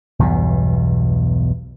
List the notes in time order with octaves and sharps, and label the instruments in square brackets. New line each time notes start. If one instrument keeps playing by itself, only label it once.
[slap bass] B1 E2 G2 B2